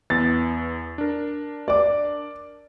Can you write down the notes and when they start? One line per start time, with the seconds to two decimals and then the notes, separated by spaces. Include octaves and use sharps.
0.10 E2 B3 A6
0.98 D4 A#4
1.68 D5 D6